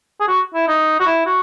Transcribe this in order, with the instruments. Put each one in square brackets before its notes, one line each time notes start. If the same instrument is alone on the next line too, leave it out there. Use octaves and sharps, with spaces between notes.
[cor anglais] G#4
F#4
E4
D#4
F#4
E4
F#4